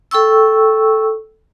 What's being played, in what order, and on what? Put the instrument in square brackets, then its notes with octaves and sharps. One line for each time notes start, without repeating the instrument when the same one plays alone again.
[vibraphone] A4 G5 C#6 E6